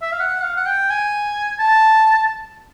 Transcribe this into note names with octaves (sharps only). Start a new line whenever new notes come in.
E5
F5
F#5
F5
F#5
G5
G#5
A5